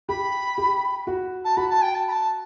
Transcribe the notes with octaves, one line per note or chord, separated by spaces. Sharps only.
G4 B5
G4
F#4
A5
F#4 B5
A5
G5
A5
B5
A5